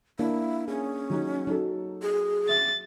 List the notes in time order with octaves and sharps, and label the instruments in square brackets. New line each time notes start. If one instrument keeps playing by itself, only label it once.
[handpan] A#3 [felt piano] D4 [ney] E4
[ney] C#4 [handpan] G#4
[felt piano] F#3 D#4 F#4
[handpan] F#3 [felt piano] D#4 A4
[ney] G#4
[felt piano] E5 [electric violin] A6